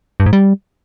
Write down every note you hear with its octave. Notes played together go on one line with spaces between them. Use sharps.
G2
G#2
G3